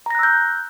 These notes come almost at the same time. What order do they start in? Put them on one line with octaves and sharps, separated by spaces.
A#5 A#6 F#6 E6 G6